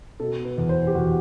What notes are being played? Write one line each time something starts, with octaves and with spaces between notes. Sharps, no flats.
B2 A4
B4
E2
C5
G4
E2 F#4